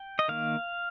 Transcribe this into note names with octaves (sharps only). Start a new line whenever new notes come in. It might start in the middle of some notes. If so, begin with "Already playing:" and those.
Already playing: G5
D#5
D#3 A#3 F5